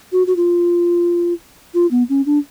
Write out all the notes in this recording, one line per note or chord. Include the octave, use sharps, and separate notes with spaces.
F#4
F#4
F4
F4
B3
C#4
D4